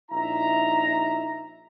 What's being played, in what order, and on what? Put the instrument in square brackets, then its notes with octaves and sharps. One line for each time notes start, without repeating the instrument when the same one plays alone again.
[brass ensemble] A#1 D#4 E4 E5 A#5